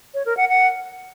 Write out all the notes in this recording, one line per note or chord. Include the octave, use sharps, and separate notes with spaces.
C#5
A#4
F#5
F#5